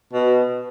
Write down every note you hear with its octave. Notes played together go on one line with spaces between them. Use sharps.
B2